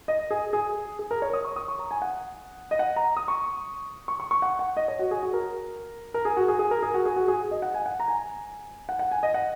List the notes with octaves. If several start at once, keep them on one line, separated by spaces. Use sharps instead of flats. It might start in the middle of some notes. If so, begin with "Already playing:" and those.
D#5
G#4
G#4
G#4
A#4
C#5
D#6
C#6
D#6
C#6
A#5
G#5
F#5
D#5
F#5
A#5
D#6
C#6
C#6
C#6
C#6
F#5
F#5
D#5
C#5
F#4
G#4
F#4
A#4
A#4
G#4
F#4
G#4
G#4
A#4
G#4
F#4
G#4
F#4
G#4
D#5
F#5
G#5
F#5
A#5
G#5
F#5
F#5
G#5
D#5
F#5